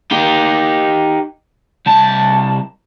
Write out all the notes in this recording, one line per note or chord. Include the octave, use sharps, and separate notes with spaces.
D#4 G4
C2 A5